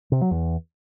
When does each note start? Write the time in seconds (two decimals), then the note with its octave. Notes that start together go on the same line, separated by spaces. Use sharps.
0.12 C3
0.21 F#3
0.31 E2